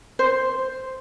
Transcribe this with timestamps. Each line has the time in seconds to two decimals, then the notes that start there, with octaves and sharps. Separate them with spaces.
0.19 C5